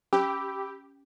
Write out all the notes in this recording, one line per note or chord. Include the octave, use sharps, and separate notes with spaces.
C#4 G4 B5 D6 E6